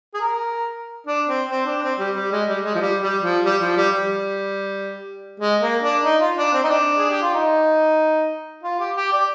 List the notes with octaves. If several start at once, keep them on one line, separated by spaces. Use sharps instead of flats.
G#4
A#4
D4
C4
C4
D4
C4
G3
G3
G#3
G3
G#3
F3
G3
G3
F3
G3
F3
G3
G3
G#3
A#3
D4
D#4
F4
D4
C4
D#4
D4
G#4
G4
F4
D#4
F4
G4
G4
D5